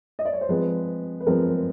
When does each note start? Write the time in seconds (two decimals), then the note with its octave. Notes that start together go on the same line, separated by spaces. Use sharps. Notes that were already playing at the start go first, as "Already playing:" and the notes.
0.19 D#5
0.25 D5
0.33 C#5
0.41 C5
0.49 F3 G#3 C4 B4
1.20 B4
1.27 F3 G#3 C4 A#4